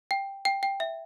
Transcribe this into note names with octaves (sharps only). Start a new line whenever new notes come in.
G5
G5
G5
E5